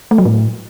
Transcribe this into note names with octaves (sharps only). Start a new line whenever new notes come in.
A3
F#3
A2